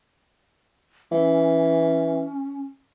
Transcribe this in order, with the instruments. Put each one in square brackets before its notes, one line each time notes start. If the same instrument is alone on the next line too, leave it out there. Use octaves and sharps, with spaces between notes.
[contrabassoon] E3 [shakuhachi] C#4